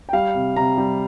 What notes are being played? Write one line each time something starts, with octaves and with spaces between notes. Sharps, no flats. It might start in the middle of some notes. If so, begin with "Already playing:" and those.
G5
G3 F5
C3
C3 A#5
G3